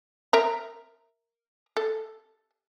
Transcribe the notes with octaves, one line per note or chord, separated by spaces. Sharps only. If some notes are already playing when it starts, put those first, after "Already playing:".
A#4 E5 A#5
A4